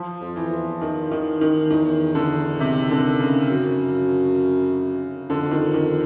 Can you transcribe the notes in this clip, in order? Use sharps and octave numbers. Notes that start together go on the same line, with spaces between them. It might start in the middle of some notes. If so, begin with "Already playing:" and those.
Already playing: F3
F2
E3
E2
D#3
D#3
D#3
E2 D#3
D3
C3
D3
C#3
F#2
F2 D3
D#3
D#3